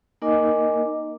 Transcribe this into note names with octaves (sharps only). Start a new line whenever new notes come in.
A#3 D#4 A#4 D#5 G#5 D6